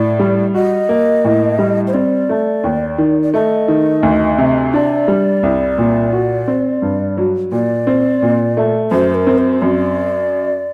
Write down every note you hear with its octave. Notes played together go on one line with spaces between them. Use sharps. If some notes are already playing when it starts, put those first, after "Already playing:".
Already playing: A2 D5
G3
F#4 D#5
A#3
A2
G3
C5
C4 D5
A3
D#2
D#3
D5
A3 D#5
D#3
D2
C3
D4 D5
G3
C2
A#2
F#4
C4
G2
F#3
A#2 D5
C4
A#2
A3
F#2 C5
A#4
C4
C5
F#2 D5